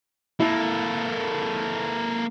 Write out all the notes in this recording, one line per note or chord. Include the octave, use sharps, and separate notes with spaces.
A#3 E4 A4